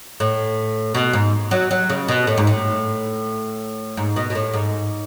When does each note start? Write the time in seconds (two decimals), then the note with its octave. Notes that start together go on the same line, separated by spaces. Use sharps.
0.20 A2
0.95 B2
1.13 G#2
1.51 F#3
1.71 F#3
1.90 C#3
2.08 B2
2.27 A2
2.38 G#2
2.47 A2
3.97 G#2
4.16 B2
4.30 B2
4.35 A2
4.53 G#2